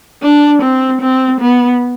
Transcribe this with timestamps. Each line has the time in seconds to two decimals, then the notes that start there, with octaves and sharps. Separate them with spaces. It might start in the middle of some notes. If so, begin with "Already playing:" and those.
0.23 D4
0.62 C4
1.02 C4
1.41 B3